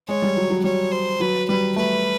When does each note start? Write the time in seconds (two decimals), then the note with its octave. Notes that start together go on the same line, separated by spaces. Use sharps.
0.08 G#3 C#5
0.22 G3
0.37 F#3
0.50 F#3
0.64 G3 C#5
0.92 C5
1.20 F#3 B4
1.48 G3 B4
1.76 A3 B4